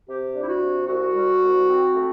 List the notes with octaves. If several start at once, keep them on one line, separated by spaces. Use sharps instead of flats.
C3 G4
D4
E4
F#4
C3
C2 F#4
G3
C2
C4
A3